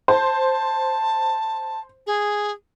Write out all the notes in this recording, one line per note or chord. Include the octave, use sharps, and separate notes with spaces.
C5 A5
G#4